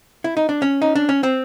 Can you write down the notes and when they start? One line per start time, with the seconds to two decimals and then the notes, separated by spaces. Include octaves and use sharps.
0.24 E4
0.37 D#4
0.49 D4
0.62 C#4
0.82 D#4
0.95 D4
1.09 C#4
1.23 C4